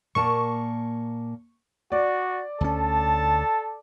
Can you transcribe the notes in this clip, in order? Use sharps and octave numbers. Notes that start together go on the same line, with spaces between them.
A#2 A#3 A5 C#6
F#4 D5
D2 C#4 A4 A5